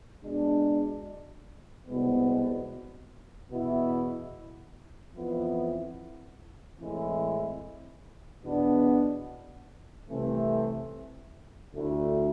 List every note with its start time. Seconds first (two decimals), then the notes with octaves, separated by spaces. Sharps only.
0.23 B2 G#3 D4
1.86 C2 B2 G#3 B3
3.51 E2 B2 B3 E4
5.16 F2 E3 B3 E4
6.79 A2 E3 G#3 C4 E4
8.44 E2 B2 B3 D4
10.09 C2 C3 E3 A3 C4
11.73 D2 D3 A3 E4